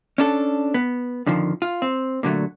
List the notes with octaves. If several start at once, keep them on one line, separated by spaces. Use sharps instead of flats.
C#4 D4 A4
B3
F2 D3 D#3 F3
F4
C4
A#2 D3 F#3 A3